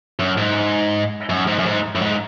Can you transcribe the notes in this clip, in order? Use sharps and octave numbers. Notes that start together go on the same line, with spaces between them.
F#2
G#2
F#2
G#2
F#2
G#2
F#2
G#2